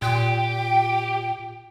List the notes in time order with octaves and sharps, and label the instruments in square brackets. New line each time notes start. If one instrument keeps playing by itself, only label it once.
[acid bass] A#2 [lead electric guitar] G4 [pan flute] G5